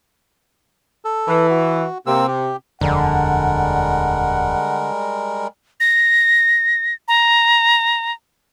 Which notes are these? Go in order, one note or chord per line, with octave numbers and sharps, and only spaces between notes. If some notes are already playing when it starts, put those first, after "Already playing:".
A4
E3
F#4
C3 A#3 C4 E6
G4
D#1 F2 D3 G3 G#3 A#4 F#5
A#6
A#5